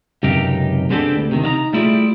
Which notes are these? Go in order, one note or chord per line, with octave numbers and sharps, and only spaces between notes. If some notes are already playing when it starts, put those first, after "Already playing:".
C#2 F#2 C3 D#4 G4 F5
G#3 B3 C4 D4 G4 A4
D2
C3 D#3
D#4 F5 A#5
G3 A3 E4 F4 G#4 D5